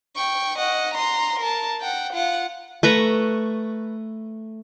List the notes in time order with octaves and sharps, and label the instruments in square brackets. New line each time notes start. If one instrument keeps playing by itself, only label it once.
[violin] G5 C#6
D#5 F#5
A#5 C6
A#4 A5
F#5 G5
F4 F#5
[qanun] A3 B4 A#5 C#6